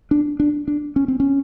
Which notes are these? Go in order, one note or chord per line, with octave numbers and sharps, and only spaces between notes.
D4
D4
D4
C#4
C4
C#4